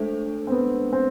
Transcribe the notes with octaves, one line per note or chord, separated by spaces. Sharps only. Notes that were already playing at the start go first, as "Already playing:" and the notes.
Already playing: G#3 A3 D4 A4 C5
C4
B3
C4